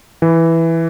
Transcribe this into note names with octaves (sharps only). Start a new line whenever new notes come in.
E3